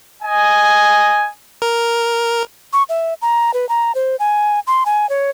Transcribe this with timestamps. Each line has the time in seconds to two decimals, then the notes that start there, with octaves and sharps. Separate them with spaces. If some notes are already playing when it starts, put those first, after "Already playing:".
0.23 D#5 G#5
1.62 A#4
2.73 C#6
2.89 E5
3.22 A#5
3.54 B4
3.69 A#5
3.95 C5
4.20 G#5
4.67 C6
4.86 G#5
5.09 C#5